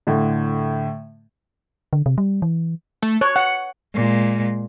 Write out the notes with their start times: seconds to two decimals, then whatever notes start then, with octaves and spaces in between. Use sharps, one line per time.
0.07 A2 D3
1.93 D3
2.06 C3
2.18 G3
2.42 E3
3.02 A3
3.21 C#5 F#6
3.36 F#5 C#7
3.94 A#2 G#3